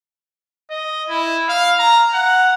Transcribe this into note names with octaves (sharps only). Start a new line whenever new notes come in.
D#5
E4
F5
A#5
F#5